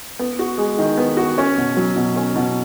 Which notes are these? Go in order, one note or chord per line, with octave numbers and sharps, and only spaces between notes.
B3
F#4
G#3
D#3
B3
F#4
C#4
B2
F#3
B2
C#4
B2